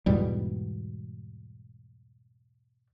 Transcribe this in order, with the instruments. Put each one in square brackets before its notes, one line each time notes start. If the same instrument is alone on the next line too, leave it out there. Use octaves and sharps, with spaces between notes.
[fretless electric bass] E2 G#2 B2 G3